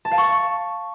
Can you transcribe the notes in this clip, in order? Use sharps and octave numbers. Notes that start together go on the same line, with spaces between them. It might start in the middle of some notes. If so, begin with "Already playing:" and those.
A5
F5
C#6